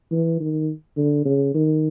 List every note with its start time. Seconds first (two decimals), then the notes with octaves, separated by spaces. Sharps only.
0.11 E3
0.40 D#3
0.97 D3
1.25 C#3
1.54 D#3